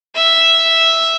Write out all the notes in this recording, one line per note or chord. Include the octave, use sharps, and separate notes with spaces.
E5